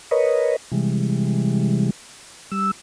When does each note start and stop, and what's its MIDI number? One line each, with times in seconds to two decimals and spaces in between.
0.11 0.56 70
0.11 0.56 71
0.11 0.56 73
0.11 0.56 75
0.72 1.90 48
0.72 1.90 52
0.72 1.90 55
0.72 1.90 56
2.52 2.71 55
2.52 2.71 88